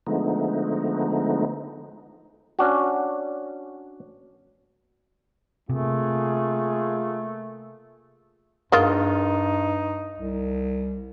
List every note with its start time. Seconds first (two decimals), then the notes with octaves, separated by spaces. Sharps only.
0.07 D3 F3 G#3 A3 B3 D#4
2.59 C#4 D4 F#4
5.69 C3 A3 A#3 F4 G#4
8.72 G2 G#3 A#3 D#4 F4
10.18 C2